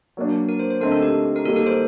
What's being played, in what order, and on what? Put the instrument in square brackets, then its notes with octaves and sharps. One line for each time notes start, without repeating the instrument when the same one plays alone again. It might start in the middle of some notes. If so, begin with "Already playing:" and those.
[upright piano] F#3 A#3 D4
[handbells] A#4
C5
C5
[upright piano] D3 A3 C4 D#4 [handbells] A#4
[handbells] A4
G4
A#4
[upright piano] D#3 G3 A#3 [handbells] A4
[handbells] A#4
C5